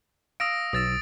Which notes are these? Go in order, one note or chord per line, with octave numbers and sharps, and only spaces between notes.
F5 D#6 E6 A#6 D7
B1 D#6 E6 A6